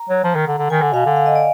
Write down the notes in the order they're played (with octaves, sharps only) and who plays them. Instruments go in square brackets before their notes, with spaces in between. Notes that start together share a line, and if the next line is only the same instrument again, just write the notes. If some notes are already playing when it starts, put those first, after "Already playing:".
Already playing: [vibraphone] A#5
[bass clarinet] F#3
F3
D#3
D3
D3
[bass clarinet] D#3 [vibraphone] G#5
[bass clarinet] D3
[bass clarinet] B2 [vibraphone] F5
[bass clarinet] D3
[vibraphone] F5
D#5
D5